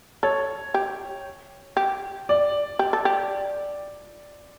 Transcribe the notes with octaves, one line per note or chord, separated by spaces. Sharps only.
A4 C#5
G4
G4
D5
G4
A4
G4